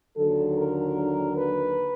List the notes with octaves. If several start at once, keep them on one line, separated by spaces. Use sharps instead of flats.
D#2 D3 F#3 A4
A#4
B4